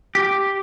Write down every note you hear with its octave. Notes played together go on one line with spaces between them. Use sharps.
G4